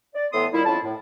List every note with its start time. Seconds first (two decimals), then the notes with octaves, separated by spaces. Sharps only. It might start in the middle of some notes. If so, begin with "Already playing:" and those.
0.15 D5
0.33 A2 E3 B3 A4 C6 D#6
0.53 A#2 D#3 G3 E4
0.65 F2 C#4 E4 A5
0.85 A2